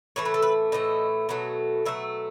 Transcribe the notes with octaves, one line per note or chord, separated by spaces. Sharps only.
A2 E3 A3 C#5
B4
A4
B4
A2 E3 A3 D#5
B2 F#3 A3
B2 F#3 A3 E5